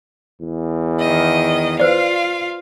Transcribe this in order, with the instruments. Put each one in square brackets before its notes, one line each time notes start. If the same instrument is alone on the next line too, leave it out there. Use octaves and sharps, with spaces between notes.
[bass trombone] E2
[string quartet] D#3 D#5
[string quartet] F4 F5 [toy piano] B4 C5 D5